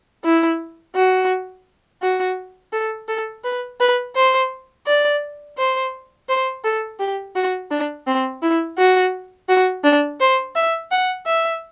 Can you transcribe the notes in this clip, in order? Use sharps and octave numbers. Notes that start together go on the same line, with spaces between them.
E4
F#4
F#4
A4
A4
B4
B4
C5
D5
C5
C5
A4
G4
F#4
D4
C4
E4
F#4
F#4
D4
C5
E5
F#5
E5